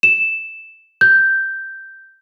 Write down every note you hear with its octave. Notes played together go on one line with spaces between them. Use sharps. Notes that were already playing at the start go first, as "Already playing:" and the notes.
E7
G6